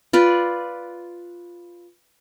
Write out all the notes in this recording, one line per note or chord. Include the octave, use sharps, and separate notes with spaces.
F4 B4 D5